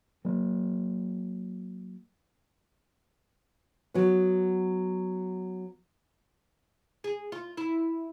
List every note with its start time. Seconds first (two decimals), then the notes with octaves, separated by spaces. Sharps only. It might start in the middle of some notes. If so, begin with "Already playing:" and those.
0.25 F#3 A#3
3.94 F#3 B3
7.04 G#4
7.32 F4
7.57 E4